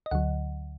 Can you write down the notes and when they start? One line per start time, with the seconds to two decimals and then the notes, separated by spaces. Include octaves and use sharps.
0.06 D#5
0.11 D2 D3 F#3 F#5